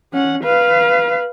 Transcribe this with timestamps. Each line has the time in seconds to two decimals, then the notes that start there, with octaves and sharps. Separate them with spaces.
0.13 C#4 F#5
0.44 B4 F5